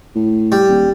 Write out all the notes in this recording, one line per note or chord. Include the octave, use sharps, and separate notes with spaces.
A2
G3
D#1